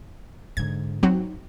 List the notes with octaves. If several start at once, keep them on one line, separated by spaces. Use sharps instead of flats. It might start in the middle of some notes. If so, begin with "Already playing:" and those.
G#2 D3 G#6
F#3 C4 D#4 F#4